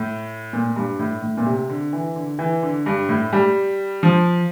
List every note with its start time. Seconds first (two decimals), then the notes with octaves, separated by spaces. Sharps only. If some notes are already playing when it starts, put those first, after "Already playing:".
Already playing: A2
0.53 A#2
0.76 G2
0.99 A2
1.22 A2
1.37 A#2
1.46 C3
1.70 D3
1.93 E3
2.16 D3
2.39 E3
2.63 D3
2.86 G2
3.09 A2
3.33 G3
4.03 F3